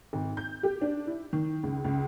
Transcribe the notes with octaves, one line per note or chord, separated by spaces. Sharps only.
G#1
G6
G4
D4
E4
D#3
C#2
C#2